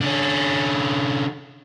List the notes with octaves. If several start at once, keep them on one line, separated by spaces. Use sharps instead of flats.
D3 C#4